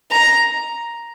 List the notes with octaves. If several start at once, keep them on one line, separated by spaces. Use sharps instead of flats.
A#5